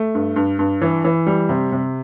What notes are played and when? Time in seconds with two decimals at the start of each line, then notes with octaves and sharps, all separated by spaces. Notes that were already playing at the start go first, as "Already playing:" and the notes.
Already playing: A3
0.15 G2
0.36 G2
0.59 G2
0.82 E3
1.05 E3
1.26 G3
1.49 C3
1.72 C3